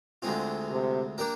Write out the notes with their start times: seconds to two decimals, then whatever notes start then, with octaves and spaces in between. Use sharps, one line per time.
0.22 D2 D3 G#3 C4 F4
0.70 C3
1.18 A#3 D4 G4 A#4